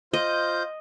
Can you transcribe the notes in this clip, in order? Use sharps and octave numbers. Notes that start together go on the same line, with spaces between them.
F4 C5 D#5 G6